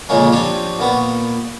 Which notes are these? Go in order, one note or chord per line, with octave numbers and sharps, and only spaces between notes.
F2 A#2 C#3 G#3 A#3 C#4
F3 C4 D4 G4 C5 C#5
A#2 B3 C#6